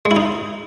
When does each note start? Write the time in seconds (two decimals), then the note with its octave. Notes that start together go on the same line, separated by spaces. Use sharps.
0.05 G#3
0.11 E4
0.16 D#4